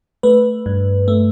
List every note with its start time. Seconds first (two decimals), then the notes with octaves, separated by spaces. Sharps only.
0.23 A3 B4
0.66 G2
1.08 A3